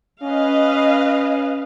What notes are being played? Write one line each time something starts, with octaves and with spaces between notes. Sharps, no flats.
C#4 B4 D#5 F5